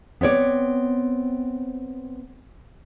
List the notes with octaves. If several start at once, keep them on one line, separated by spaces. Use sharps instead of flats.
B3 C4 C#5 D5